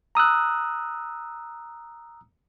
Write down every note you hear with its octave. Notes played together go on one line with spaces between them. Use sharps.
A#5 D#6 E6 F#6